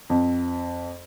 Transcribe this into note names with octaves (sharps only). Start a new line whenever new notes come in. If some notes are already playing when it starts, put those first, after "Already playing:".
F2